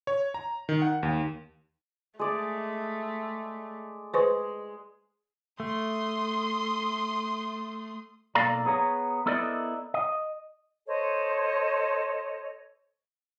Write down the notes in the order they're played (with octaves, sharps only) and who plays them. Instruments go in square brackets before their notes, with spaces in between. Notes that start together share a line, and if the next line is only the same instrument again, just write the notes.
[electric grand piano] C#5
A#5
D#3
F#5
D#2
[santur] G#3 D5 [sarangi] A3
[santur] G#3 [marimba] B4 C5 C#6
[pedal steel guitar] A3 [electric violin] C6 D#6
[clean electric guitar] B1 A#3 A4 D5 F5 A#5
B3 G#4 C#5 A#5
B3 E4 A4 A#4 D5 D#5
D#5
[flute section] A4 C5 C#5 D#5